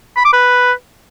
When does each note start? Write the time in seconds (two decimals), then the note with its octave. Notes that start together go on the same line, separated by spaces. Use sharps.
0.16 B5
0.25 D6
0.33 B4